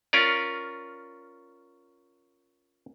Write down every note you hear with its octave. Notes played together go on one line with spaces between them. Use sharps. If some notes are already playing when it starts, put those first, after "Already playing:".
C#4 F4 A#4 D5